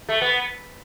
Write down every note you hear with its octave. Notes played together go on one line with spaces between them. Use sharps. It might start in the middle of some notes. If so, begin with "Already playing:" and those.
A3
B3